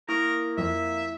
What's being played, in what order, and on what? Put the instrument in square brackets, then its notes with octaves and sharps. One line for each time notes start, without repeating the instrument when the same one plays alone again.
[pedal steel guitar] A#3 C#6 D#6 [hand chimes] E4 [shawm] A#4
[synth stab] F2 [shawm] E5